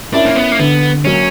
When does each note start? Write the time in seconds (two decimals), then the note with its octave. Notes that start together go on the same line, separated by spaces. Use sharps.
0.14 C#4 D4 E4 A#4
0.25 A#3
0.36 B3
0.52 A#3
0.59 D3 B3
1.04 F#3 A#3 C#4